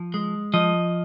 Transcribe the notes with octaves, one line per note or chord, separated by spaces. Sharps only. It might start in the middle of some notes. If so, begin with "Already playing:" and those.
Already playing: F3
G#3
F3 D#5